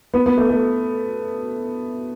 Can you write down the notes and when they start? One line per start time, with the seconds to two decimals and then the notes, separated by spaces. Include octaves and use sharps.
0.14 B3
0.26 B3
0.38 A3
0.49 A3